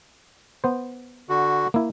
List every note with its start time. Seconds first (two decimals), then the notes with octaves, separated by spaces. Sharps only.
0.64 B3 C5
1.29 D3 F#4
1.74 A#3 E4